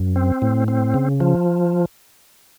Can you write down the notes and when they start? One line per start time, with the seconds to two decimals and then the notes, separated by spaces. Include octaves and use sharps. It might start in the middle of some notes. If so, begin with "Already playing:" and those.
Already playing: F#2
0.16 C4
0.42 A2
0.68 C4
0.94 C#3
1.20 F3